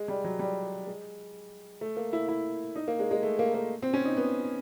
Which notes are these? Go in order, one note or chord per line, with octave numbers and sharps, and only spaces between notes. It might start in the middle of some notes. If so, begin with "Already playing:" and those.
Already playing: G#3
G3
F#3
G3
G#3
A3
A#3
E4
E4
D#4
A#3
G#3
G#3
A3
A#3
A#3
C4
C#4
D#4
B3